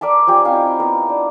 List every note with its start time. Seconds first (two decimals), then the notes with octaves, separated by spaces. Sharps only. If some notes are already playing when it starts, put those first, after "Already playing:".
0.01 A#4 D5 E5 A5
0.27 F3 C#4 G4 G#5
0.45 C4 D#4 E4 F5
0.80 B3 A#4
1.09 D4